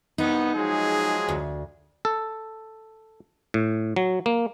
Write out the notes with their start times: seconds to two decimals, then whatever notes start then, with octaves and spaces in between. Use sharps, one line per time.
0.18 C2 B3 D#4
0.56 F3 F#3 G#3 G#4
1.28 D2
2.05 A4
3.54 A2
3.96 F#3
4.26 A#3